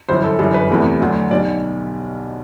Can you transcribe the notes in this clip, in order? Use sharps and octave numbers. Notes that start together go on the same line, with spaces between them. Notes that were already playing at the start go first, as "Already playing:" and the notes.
G1 F#2 E3 C5
A4
G1 F#2 E3 G3 A4
B4
E2 C3 E3 A3
D2 D3 F#3 A3
B1 B2 G3 D5